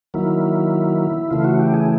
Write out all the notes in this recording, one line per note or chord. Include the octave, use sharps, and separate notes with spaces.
D#3 F#3 A#3 E4
C#3 E3 A3 F4
F#4
G4
G#4